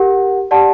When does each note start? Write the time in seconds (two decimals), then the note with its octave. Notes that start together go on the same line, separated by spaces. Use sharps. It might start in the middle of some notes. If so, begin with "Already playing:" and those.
Already playing: G4 A#4 F#5
0.51 G4 D5 F#5 A5